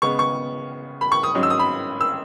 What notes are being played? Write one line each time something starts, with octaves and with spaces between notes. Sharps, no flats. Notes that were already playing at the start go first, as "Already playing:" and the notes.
C#3 G#3 B3 C#6
C#6
B5
C#6
D#6
G#2 F#3 C#4
E6
D#6
B5
E6